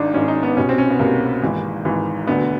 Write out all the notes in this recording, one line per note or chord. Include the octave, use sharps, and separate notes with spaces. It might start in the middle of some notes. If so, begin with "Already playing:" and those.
Already playing: G#1 G#2 D#3 D4 D#4
G#1 G#2 D#3 C#4
D#4
B3
C2 B2 C#4
C4
C#4
B3
C2 B2 A#3
G#1 G#2 E3
G#1 G#2 E3
E1 D2 D3 B3